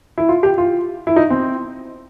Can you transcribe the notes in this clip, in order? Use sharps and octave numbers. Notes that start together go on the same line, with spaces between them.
E4
F4
G4
F4
E4
D#4
C4